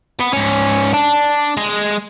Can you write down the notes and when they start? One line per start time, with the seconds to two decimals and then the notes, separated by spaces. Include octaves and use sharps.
0.20 B3
0.33 G#2 C#4
0.94 D4
1.57 G#3